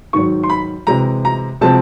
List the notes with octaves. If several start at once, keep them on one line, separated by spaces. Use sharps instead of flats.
G#2 D#3 F#3 C#6
C6
B5
C3 E3 G#3 A#5
A#5
C3 F3 G#3 C4 A5